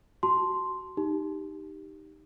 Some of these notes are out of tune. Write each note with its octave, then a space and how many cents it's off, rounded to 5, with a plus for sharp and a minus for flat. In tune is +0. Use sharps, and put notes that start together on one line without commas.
F#4 +20 A5 +0 C6 +0
D#4 +0 G4 +0